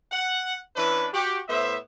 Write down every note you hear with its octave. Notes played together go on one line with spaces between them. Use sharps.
F#5
E3 C#4 D4 E4 B4
F#4 G4
A2 B3 C5 E5